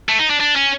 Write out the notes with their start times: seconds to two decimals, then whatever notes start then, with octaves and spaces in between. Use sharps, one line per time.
0.09 A3
0.19 D#4
0.30 D4
0.40 D4
0.56 C#4